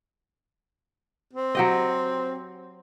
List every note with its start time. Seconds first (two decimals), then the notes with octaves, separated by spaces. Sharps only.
1.33 C4
1.55 F#3 G4 D#5